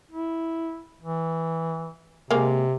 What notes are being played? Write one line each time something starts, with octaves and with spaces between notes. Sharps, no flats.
E4
E3
C3 G#3 A#3